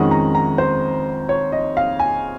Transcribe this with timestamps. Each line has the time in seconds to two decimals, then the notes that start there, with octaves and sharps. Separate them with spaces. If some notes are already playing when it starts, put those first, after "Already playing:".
Already playing: F2 D#3 G#3 C#4 F#5
0.11 A#5
0.35 A#5
0.58 C5
1.29 C#5
1.52 D#5
1.77 F5
2.00 G#5